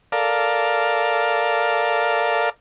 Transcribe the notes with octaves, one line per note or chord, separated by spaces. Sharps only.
A4 A#4 D5 F5